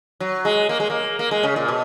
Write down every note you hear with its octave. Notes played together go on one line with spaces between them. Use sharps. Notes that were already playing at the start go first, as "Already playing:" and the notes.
F#3
G#3
A#3
G#3
A#3
A#3
G#3
C#3
A#2
B2